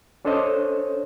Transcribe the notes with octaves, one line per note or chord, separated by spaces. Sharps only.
C#4 D4 A4 C5 C#5 D#5